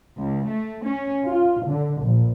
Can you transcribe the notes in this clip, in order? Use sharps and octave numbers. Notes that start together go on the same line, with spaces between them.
C#2
A3
C#4
F4
D3
A#1